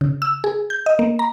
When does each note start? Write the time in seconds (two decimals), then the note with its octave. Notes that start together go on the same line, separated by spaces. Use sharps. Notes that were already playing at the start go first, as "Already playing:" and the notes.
0.01 C#3
0.22 E6
0.44 G#4
0.70 G6
0.86 D#5
0.99 A#3
1.19 A#5